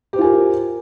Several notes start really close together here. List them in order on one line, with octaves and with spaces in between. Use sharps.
G4 C5 F4 G#5 A#4